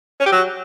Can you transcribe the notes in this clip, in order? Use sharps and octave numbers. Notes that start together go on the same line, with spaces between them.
C#4
G4
F#3